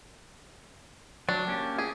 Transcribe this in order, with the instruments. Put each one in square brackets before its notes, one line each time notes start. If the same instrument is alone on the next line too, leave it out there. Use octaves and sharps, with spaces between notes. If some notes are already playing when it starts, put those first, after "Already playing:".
[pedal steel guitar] F#3 [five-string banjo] D4
[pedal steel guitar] A#3 C#4 G4
[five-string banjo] G#4